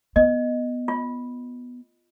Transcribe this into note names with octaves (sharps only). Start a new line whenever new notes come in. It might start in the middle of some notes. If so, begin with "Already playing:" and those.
B3 D#5
F4